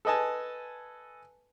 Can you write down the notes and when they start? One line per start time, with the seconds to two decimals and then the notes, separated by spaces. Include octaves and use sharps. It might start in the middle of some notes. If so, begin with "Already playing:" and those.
0.05 A4 B4 D#5 G#5 A5